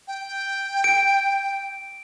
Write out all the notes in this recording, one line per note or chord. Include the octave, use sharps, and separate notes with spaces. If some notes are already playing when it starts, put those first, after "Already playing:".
G5
D7